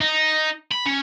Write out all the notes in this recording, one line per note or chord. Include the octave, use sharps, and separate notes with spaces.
D#4
B5
C#4